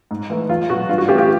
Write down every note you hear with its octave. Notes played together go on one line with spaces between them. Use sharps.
G#2
E3 A3
E2 F4
B2 F#3 F#4
G2 F4
F#4
E3 A3 C#4 F4 G4
F4 G4